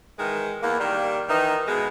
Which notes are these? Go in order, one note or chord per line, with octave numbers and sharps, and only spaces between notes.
D#3 E3 G#3
E2 A#3
D#3 G3 A#3
D#3 E3 D#4
B2 G#3